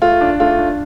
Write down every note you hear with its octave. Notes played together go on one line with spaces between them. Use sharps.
A3 F4
D4
A3 F4
D4